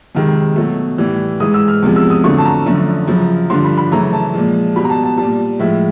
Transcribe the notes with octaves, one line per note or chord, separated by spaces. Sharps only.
F2 C3 D#3 G#3
B2 F#3 A3
A2 E3 G3
G#2 E3 G#3 D#6
E6
F6
E2 C3 F3 G#3
E6
D#6
F2 D3 F#3 A3 C#6
A5
A#5
F#2 D3 F3 A3
F#2 C#3 F3
G2 D3 F3 C6
B5
B5
F#2 C#3 E3 A3 A#5
A5
A#2 F3 G#3
B2 G3 B5
A#5
A5
A5
A#2 G3 A5
A2 F3 G#3 E5